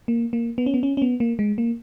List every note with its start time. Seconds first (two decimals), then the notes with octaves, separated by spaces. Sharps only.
0.08 A#3
0.33 A#3
0.58 B3
0.66 C#4
0.74 B3
0.83 C#4
0.97 C#4
1.02 B3
1.20 A#3
1.39 G#3
1.58 A#3